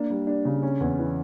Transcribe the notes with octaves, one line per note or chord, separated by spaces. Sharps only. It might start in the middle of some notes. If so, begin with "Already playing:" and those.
Already playing: A#3 D4
G3
D4
C#3
C#4
E2
E3